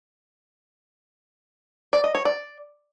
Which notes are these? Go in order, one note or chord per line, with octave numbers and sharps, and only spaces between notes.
D5
D#5
C#5
D5